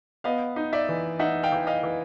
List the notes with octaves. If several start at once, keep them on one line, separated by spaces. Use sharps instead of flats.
B3 D#5 F5
D#4
D5 E5
E3
D#4 E5 F#5
F5 G5
E3
D#5 F5
E3